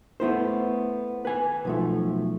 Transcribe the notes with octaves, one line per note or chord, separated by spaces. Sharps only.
A3 B3 E4 C5
B4 G#5
B1 F3 A3